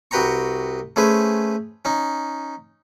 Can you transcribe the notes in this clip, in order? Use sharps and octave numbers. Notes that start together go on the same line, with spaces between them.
C2 F#4 B4 G5 A#5 C#6
A3 C#4 G#4 B4 C5
C#4 D#4